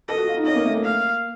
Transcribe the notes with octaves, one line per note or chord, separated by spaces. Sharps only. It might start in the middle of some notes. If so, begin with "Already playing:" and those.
A4 D#5
F#4
F4
D#4
C#4 D#5
A#3
A3
A#3
F5